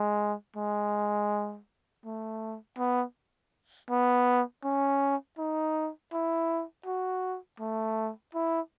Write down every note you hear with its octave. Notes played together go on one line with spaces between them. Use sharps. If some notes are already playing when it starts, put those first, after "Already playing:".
Already playing: G#3
G#3
A3
B3
B3
C#4
D#4
E4
F#4
A3
E4